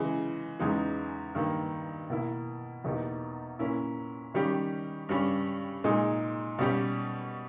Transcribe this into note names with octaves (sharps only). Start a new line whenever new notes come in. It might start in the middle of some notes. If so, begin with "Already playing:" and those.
Already playing: C#3 E3 G#3
E2 C#3 G#3 D#4 G#4
G2 D#3 A#3
B2 A#3 E4
E2 B2 A#3 D#4 G4
A#2 A#3 C#4 E4
D#3 G3 C#4 G4
G2 G3 C#4
A#2 G#3 D#4 G#4
B2 G3 C#4 G4